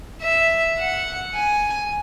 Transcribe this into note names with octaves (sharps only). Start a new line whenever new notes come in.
E5
F#5
G#5